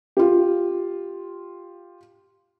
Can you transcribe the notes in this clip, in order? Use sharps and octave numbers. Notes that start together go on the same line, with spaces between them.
F4 G4